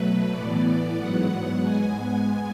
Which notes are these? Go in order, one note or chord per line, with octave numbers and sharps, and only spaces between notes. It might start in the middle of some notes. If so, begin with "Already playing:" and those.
Already playing: B2 F#3 A3 B4
A2 E3 B3 D5
G#2 F#3 B3 F#5
G#2 G#3 B3 G#5